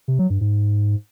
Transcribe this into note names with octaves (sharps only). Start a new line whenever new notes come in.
C3
F#3
G2
G#2